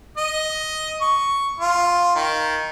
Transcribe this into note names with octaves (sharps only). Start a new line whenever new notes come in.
D#5
C#6
F4
D#3